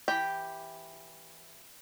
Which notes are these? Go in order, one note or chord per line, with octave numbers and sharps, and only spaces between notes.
E3 G4 G5